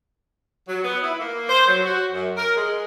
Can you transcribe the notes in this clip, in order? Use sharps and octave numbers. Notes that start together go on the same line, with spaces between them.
F#3
B3
E4
A#3
C5
F#3
F#4
F#2
A#4
G#3